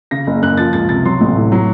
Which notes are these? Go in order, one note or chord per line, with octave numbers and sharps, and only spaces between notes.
C#3 A#6
F#1
F#2 F#6
F3 A6
C#2 A6
C3 A6
F#3 C6
A1
A2
F#3